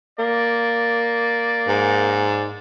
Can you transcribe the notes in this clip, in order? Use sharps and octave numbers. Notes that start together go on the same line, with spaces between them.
A#3 D5
G#2